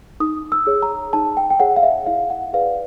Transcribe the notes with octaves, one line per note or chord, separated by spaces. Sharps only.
D#4 D#6
E6
G#4 C#5
A#5
D#4 A5
G5
G5
G#4 C#5 F#5
F5
E5
E4 F5
F#5
G#4 B4 D5 F5